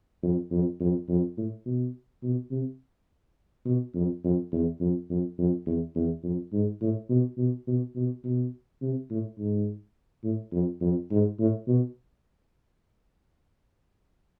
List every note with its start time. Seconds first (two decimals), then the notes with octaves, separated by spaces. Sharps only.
0.23 F2
0.51 F2
0.80 F2
1.09 F2
1.37 A2
1.65 B2
2.23 B2
2.51 C3
3.65 B2
3.95 F2
4.24 F2
4.52 E2
4.80 F2
5.10 F2
5.38 F2
5.66 E2
5.95 E2
6.23 F2
6.53 G#2
6.81 A2
7.09 B2
7.38 B2
7.67 B2
7.96 B2
8.24 B2
8.82 C3
9.10 A2
9.38 G#2
10.24 A2
10.52 F2
10.81 F2
11.11 G#2
11.39 A2
11.67 B2